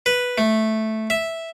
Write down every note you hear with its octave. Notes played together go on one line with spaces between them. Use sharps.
B4
A3
E5